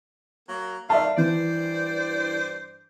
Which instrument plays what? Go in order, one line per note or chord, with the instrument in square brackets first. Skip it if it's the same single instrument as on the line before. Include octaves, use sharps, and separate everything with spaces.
[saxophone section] F#3 A#3
[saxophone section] D#3 F4 [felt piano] D5 E5 A5
[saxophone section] G2 C5 D5 [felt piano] E3